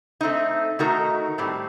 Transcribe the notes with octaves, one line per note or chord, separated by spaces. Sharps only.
A3 C4 D#4
D#3 A3 D#4 F#4 A#4
A2 G3 C4